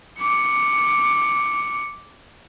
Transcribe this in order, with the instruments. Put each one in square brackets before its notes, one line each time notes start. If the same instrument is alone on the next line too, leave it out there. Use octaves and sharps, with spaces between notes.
[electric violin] D6 C#7